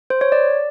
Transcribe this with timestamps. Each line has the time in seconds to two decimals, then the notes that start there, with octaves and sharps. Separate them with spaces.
0.10 C5
0.21 C#5
0.32 D5